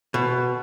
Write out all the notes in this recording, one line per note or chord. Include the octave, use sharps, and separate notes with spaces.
B2